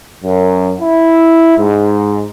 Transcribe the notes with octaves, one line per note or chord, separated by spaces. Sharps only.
F#2
E4
G#2